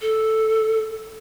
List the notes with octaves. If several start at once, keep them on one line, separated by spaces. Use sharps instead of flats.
A4